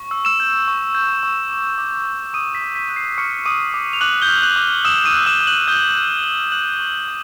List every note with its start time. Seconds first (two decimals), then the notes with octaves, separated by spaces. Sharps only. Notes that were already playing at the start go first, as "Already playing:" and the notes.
Already playing: C#6
0.11 E6
0.25 E6 E7
0.40 G6
0.68 C#6
0.95 G6
1.23 C#6
1.50 D6
1.78 D6
2.06 D6
2.34 D6 D#6 D#7
2.55 B6
2.62 D6
2.75 B6
2.90 F#6
2.96 C7
3.17 C#6 F6 C#7
3.45 D6 D#6 D#7
3.74 D6
3.93 F7
4.01 D6 F#6 F#7
4.22 G6 G7
4.29 F6
4.43 F#6 F#7
4.56 D6
4.85 D#6 E6 E7
5.05 D#6 D#7
5.13 F#6
5.26 E6 E7
5.41 D#6
5.47 F#6 F#7
5.68 D#6 G6 G7
5.96 F#6
6.24 F#6
6.52 E6 F#6 F#7
6.80 C#6
7.08 C#6